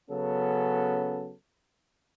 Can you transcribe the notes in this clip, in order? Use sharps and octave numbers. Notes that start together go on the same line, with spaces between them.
C#3 F#3 B3 C#4 A4